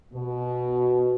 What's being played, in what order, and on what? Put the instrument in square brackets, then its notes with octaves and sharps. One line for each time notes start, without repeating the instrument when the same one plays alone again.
[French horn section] B2